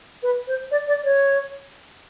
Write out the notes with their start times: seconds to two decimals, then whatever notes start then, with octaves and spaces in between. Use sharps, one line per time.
0.23 B4
0.48 C5
0.71 D5
0.88 D5
1.04 C#5